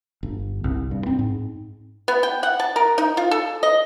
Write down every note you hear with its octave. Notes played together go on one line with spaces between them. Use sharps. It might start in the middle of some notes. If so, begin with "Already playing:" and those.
G1
C2
G2
C4
G#2
B3
G5
F#5
A5
A#4
D#4
F4
A4
D#5